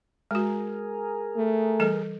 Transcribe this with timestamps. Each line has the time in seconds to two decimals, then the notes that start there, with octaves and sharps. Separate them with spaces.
0.31 G#3 F#4 G#4 A#4
1.36 A3
1.80 E3 G3 A4